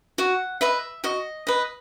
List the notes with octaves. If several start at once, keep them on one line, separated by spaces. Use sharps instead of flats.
F#4 F#5
B4 D#5 E5
F#4 D#5
B4 D#5